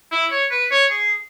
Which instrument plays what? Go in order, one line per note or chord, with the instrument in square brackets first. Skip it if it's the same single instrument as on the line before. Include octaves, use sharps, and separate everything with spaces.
[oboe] E4
C#5
B4
C#5
G#4